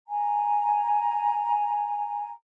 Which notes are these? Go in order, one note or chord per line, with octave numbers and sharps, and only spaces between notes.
G#5 A#5